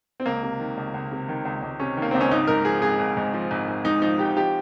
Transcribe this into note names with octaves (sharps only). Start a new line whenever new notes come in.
C4
C#2 A#3
C3
D#3
C#2
C#2
C3
D#3
C#2
C#2
C3 C#4
D#3
A#3
C#2 C4
C#4
G#1 D#4
G#2 A#4
F3 G#4
G#1 G#4
G#1
G#2
F3
G#1
G#1
G#2 D#4
F3 D#4
G#1 G4
F3 G4